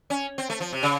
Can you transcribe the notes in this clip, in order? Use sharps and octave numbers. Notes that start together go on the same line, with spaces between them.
C#4
C4
A3
F3
C3
C#3